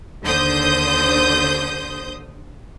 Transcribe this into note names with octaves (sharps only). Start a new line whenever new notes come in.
D#2 D3 C5 D#6 G6